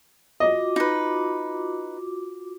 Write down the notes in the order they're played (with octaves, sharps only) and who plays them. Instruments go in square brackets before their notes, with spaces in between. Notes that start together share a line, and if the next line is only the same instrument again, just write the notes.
[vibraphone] F4 F#4 D6 [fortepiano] D#5
[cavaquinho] D#4 B4